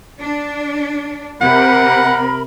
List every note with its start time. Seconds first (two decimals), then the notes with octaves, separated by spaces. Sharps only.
0.20 D4
1.41 C3 A#4 F#5 B5